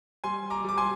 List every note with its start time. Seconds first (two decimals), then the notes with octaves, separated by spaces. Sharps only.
0.24 G3 G#5 C6
0.50 A#5 D6
0.65 G3 D6
0.78 G#5 C6